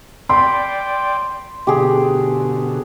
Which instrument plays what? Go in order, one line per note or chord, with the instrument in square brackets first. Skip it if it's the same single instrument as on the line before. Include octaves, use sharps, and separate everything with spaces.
[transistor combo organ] D5 G5 [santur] B5 [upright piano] C6
[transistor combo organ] B2 D3 [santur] G4 G#4